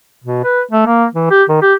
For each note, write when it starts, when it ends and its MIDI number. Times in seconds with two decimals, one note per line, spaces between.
0.24 0.43 47
0.44 0.62 71
0.71 0.86 57
0.86 1.06 58
1.14 1.28 52
1.31 1.44 67
1.49 1.58 51
1.62 1.74 67